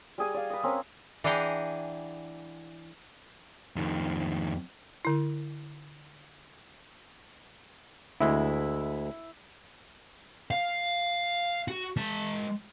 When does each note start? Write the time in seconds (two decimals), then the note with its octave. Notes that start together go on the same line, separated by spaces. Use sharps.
0.18 G3 G#4 G#5
0.34 D5 F5
0.50 B4 D#5
0.63 C4 C#4 A#4
1.24 E3 D4 G#4 F#5 G5 A#5
3.76 F2 D#3
5.05 D3 E4
8.20 D2 G#3 E4
10.51 F5
11.68 F#4
11.96 G#3 A5